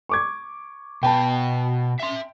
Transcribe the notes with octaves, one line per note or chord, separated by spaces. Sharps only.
C#6 D6 G#6
B2 B4 G5 A5
E5 C6